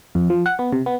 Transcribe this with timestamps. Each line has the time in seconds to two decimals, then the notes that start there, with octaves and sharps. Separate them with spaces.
0.15 F2
0.30 F3
0.46 F#5
0.59 B3
0.73 C3
0.86 B3